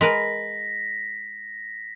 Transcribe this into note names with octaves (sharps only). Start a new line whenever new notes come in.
G#3 A#4 B4 A#6 B6